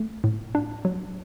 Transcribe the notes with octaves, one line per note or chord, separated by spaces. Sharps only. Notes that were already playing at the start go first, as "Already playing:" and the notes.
Already playing: A3
A2
D4
F#3